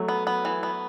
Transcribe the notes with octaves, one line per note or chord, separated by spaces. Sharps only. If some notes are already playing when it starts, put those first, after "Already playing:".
Already playing: F#3 A3
B3
B3
E3
B3